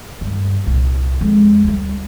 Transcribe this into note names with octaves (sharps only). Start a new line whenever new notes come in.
D2 G2
C2 A#2
F2 G#3
D2 G3